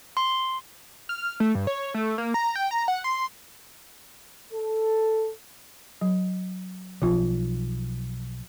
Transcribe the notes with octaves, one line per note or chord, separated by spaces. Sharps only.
C6
F6
A3
G2
C#5
A3
A#3
A#5
G5
A#5
F#5
C6
A4
F#3
B1 F3 F4